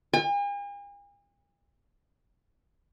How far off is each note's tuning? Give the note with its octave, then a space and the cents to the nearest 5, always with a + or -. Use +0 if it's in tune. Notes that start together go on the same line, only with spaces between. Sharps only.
G#5 -45